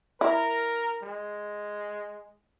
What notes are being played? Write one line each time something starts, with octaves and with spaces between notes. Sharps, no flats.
E4 A#4
G#3